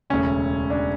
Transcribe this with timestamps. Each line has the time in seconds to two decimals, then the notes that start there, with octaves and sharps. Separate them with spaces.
0.10 E1 D2 C#3 C#4
0.70 D4